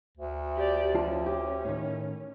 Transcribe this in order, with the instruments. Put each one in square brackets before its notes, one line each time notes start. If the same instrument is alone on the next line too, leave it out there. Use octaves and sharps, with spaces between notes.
[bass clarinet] D2
[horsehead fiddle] G4 D5
[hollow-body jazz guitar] F2 F4 A5 [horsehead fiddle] C#4
[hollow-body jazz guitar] G4
A2 D#3